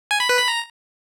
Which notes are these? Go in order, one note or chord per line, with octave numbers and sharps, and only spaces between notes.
G#5
B5
B4
B5
A#5